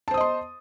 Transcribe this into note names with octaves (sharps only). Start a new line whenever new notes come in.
C5 D#5 A5 C6 D#6